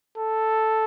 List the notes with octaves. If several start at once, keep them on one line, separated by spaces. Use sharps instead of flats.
A4